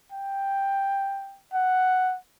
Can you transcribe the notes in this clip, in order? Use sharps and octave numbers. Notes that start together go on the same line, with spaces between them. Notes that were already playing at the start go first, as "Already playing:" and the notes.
G5
F#5